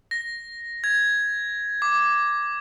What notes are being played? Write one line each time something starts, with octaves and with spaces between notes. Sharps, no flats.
A#6
G#6
D6